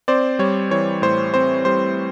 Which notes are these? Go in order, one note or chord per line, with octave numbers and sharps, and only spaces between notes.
C4 C5 D5
G3 C#5
E3 C#5
A2 C5
C4 C5
G3 C5